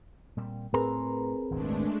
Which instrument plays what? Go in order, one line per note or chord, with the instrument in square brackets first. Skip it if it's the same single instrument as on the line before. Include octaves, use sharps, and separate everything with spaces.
[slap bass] A#2 G3 C4
[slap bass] A2 [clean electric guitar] C4 A#5 [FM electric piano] G#4 A#4 B4
[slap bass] D#1 G#1 [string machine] G#3 A3 D4